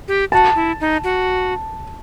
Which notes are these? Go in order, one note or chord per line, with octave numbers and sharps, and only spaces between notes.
G4
F#4 A5
E4
D#4
F#4